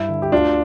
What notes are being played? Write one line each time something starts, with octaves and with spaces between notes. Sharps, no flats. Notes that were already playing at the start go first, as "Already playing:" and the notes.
Already playing: G2 E4
D3
G4
D2 D4 F4